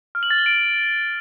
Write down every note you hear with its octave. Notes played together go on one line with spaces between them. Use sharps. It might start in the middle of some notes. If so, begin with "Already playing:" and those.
F6
F#7
A6
G7
D7